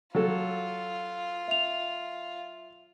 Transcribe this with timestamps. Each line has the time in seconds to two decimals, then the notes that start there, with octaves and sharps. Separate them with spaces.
0.15 F#3 F4 A4
1.48 E5 F7